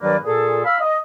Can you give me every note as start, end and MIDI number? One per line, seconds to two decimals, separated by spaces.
0.01 0.16 43
0.01 0.16 51
0.01 0.16 54
0.01 0.16 58
0.01 0.16 71
0.01 0.16 74
0.25 0.65 46
0.25 0.65 68
0.25 0.65 69
0.65 0.80 77
0.65 0.80 83
0.65 0.80 88
0.81 0.98 75